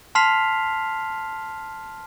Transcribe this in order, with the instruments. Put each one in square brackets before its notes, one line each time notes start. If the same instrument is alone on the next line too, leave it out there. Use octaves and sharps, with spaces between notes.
[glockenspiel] A5 C6 F6 B6 C7 F7